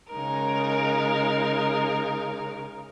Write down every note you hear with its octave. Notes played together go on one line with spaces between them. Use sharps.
C#3 G#3 D#4 A#4